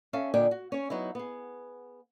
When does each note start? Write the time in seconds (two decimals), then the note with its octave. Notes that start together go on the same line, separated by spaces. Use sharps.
0.13 C#4 A4 E5 F5
0.34 A#2 D3 D5 D#5 G5 G#5
0.51 F#4
0.72 C#4 C#5
0.90 F#3 B3 D#4 E4
1.15 B3 G#4